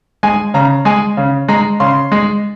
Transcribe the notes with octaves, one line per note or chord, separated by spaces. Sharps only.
G#3 G#5
C#3 A#5
G#3 G#5
C#3
G#3 A#5
C#3 C6
G#3